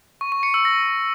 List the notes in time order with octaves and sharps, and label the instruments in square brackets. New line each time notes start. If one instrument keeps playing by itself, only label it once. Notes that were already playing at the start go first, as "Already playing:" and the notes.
[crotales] C#6
C#6
C#7
E6
A#6